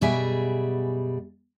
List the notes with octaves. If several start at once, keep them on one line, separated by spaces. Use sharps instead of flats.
F#2 B2 G3 G#4 E5 G#5